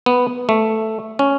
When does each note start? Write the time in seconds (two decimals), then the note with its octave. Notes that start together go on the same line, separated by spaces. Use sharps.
0.06 B3
0.49 A3
1.19 C#4